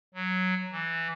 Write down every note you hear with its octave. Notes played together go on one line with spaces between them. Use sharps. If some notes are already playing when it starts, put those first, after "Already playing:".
F#3
E3